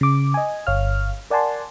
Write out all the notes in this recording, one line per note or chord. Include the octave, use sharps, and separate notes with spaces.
C#3 D6
D#5 G#5
G1 C#5 F5 F6
A#4 D5 F#5 G#5 A5 C6